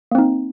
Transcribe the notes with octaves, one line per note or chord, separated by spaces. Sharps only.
A#3 C4 D#4